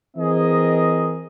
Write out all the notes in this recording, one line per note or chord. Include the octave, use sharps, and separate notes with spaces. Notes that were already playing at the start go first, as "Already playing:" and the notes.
E3 C4 G#4 A#4 D#5